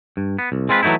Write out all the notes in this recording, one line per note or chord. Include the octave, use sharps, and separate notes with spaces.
G2
B3
C2
G#3 C4 F4 G#4 B4
E3 F#3 A3 D#4 E4